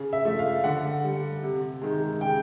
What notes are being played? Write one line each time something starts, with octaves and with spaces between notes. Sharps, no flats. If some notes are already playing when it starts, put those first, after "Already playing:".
Already playing: C#3
E5
F3 A3
F5
D3 F#5
G3
C3
D#3 G#3
C#3 G5